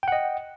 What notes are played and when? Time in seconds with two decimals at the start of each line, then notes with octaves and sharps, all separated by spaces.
0.03 G5
0.08 F#5
0.12 D#5